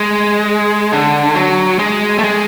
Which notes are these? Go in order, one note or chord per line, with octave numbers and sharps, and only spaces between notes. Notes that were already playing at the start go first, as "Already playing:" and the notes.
Already playing: G#3
D3
F#3
G#3
A3
G#3